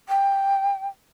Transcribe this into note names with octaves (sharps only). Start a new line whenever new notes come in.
G5